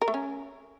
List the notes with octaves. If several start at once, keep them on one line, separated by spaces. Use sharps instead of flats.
A#4
A3
C#4